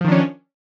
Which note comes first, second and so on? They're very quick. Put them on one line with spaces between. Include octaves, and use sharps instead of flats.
F3 D#3 D4 C#4